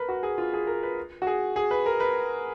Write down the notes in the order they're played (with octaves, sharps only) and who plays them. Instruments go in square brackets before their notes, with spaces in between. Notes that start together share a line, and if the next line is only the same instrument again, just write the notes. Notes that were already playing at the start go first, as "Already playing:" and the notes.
Already playing: [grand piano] A#4 B4
F#4
G#4
F4
G#4
A#4
B4
F#4
G#4
G#4
B4
A#4
B4